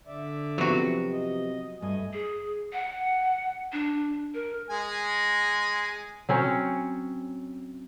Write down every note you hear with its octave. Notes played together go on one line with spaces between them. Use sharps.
D3 D5 E5
C3 F3 F#3 B3 C4 F#4
D#5
G2 A3 D#5 G#5
G#4
F#5
D4
A#4
G#3 G#5
F#3 C4 C#4